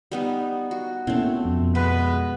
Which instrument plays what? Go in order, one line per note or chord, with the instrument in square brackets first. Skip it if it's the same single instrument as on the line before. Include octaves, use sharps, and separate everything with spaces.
[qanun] G3 B3 D#4
F#4
[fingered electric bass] B2 [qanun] A3 C4 [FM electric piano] A#3 C#4 E4
[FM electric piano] F2 F3
[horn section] G#3 B4 [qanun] B3